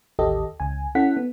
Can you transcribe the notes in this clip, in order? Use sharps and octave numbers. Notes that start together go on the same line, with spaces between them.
A1 D#2 G4 A4 D#5
C#2 G#5
C#4 E4 A4 F#5 B6
B3